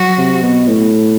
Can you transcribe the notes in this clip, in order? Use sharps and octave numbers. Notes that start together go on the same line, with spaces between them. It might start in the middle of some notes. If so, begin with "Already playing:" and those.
Already playing: F#3 F#4
C3
B2
A2